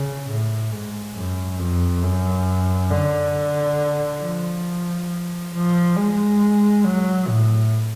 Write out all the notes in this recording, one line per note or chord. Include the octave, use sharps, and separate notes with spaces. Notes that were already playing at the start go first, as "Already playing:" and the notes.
Already playing: C#3
A2
G#2
F#2
F2
F#2
D3
F3
F3
G#3
F#3
A2